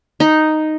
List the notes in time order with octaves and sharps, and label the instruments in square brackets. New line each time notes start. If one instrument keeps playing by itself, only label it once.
[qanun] D#4